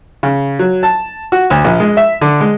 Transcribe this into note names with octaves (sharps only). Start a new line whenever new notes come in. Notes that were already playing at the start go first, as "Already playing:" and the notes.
C#3
F#3
A5
F#4
D2
A#1
G#3
E5
D3
G#3